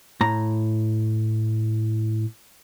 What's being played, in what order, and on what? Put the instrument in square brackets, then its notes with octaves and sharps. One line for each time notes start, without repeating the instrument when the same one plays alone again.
[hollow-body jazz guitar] A2 A#5